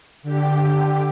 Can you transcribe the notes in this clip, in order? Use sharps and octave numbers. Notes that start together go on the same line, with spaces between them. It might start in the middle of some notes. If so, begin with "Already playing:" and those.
D3 G4